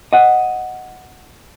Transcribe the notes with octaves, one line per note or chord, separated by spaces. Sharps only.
D#5 F#5